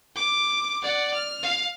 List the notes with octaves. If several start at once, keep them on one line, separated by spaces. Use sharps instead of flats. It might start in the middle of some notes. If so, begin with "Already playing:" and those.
D6
D5 F#5
F6
F5